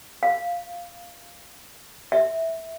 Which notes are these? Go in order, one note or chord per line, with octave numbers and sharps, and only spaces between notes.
F5
E5